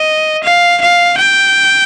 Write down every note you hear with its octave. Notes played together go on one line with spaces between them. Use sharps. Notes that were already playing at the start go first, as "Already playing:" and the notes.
Already playing: D#5
F5
F5
G5